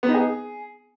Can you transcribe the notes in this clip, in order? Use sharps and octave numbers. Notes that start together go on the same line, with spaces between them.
B3
D#4
G#4